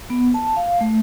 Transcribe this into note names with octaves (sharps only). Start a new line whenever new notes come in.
B3
A5
F5
A3